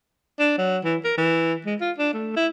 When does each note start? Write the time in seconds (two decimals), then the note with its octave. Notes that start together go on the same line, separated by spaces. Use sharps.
0.39 D4
0.58 F#3
0.85 E3
1.05 A#4
1.18 E3
1.66 G#3
1.81 F4
1.99 D4
2.14 A3
2.37 E4